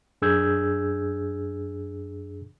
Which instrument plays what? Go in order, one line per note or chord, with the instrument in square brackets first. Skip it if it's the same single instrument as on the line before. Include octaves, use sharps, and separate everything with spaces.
[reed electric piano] F#2 D4 G#4 E6 G6 G#6